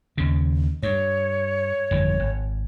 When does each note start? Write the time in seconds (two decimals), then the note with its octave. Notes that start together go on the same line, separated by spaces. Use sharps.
0.18 D#2 C#3
0.83 G2 C#5
1.91 G1 F2 D#3
2.20 G#1